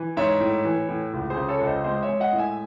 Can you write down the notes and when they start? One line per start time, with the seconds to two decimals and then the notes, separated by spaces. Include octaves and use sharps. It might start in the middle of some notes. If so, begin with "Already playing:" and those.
Already playing: E3
0.17 G#2 C#5 E5
0.40 A2
0.65 E3
0.89 A2
1.13 C#2
1.30 G#4 C5
1.37 C#3
1.48 A4 C#5
1.60 C#2
1.67 C5 D#5
1.84 G#3 C5 D#5
2.03 C#5 E5
2.09 G#3
2.20 D#5 F#5
2.33 A2
2.38 E5 G#5